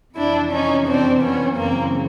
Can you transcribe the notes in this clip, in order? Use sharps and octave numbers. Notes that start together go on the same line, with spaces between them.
F2 C3 E3 D4 E4
C#4 D#4
C4 D4
B3 C#4
F#2 C#3 E3 A#3 C4